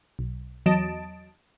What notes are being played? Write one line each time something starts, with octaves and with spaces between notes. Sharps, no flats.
B1
E2 F#3 D#5 A5 D7